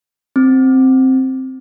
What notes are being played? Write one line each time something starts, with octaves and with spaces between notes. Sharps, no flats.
C4